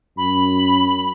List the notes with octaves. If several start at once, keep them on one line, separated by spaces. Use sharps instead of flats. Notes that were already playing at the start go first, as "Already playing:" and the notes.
F#2 B5